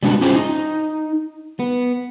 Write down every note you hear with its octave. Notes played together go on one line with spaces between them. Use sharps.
G3 G#3 B3 D4 F#4
C#4 F4 G4 G#4 C5
D#4
B3